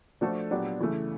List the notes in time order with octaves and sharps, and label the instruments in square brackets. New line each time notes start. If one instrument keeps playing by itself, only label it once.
[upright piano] F3 A3 D4 F#4 A4
A#2 F#3 B3 D4 G4
C#3 E3 A3